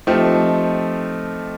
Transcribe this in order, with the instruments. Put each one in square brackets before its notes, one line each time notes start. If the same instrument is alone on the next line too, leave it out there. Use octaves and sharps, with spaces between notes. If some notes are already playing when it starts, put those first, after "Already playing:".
[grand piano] F3 A3 C4 D#4 G4